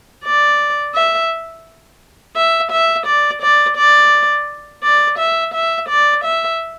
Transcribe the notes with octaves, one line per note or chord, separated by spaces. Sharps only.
D5
E5
E5
E5
D5
D5
D5
D5
E5
E5
D5
E5